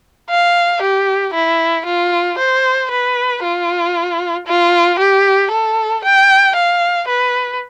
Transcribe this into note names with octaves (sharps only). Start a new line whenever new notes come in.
F5
G4
E4
F4
C5
B4
F4
F4
G4
A4
G5
F5
B4